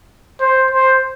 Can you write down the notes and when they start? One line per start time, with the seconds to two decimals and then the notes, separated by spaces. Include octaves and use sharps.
0.41 C5
0.71 C5